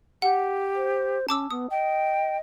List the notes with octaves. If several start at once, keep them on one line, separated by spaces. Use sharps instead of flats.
G4 F#5
C5
C#4 A5 D6 E6
B3 D#6
D#5 G5